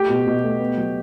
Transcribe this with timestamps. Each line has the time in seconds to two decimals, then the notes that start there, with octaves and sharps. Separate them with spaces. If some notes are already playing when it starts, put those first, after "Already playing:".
Already playing: A3 G4
0.09 B2
0.27 B2
0.44 A3
0.60 B3
0.77 F#3